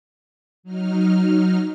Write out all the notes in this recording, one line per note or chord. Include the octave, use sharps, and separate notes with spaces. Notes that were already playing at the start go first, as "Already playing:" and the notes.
F#3 D#4 F6